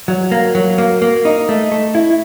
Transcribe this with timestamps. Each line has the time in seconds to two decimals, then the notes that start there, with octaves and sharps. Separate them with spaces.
0.08 F#3
0.32 A#3
0.55 F#3
0.78 A#3
1.02 A#3
1.25 D#4
1.49 A3
1.72 A3
1.95 E4